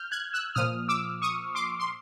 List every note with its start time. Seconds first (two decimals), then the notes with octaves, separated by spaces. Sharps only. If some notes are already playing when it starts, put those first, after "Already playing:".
Already playing: F6 G6
0.11 F#6 G#6
0.33 E6 F#6
0.55 A#2 F3 D#6 F6
0.88 D6 E6
1.22 C#6 D#6
1.55 C6 D6
1.79 C6